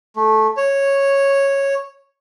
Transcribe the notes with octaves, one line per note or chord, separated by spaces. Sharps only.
A3
C#5